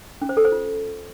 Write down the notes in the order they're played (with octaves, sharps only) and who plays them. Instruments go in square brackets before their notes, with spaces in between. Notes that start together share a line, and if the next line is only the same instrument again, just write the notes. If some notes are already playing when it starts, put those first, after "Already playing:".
[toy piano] C#4
C5
A4
C5
F4